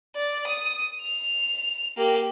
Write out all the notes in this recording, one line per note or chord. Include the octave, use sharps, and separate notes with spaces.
D5
D#6
F7
A#3 G4